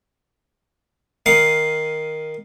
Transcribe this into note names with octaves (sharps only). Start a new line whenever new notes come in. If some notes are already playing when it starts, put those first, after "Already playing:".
D#3 F5 F#5 D#6